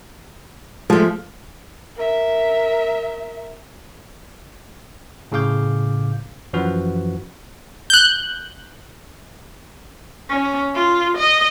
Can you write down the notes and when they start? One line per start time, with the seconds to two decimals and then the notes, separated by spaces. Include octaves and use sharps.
0.90 F3 G#3 A3
1.96 A#4 E5
5.32 A2 C#3 G#4 F5 D6 G6
6.53 F#2 E3 F3 F#4 B4
7.90 F#6 G6
10.30 C#4
10.75 F4
11.17 D#5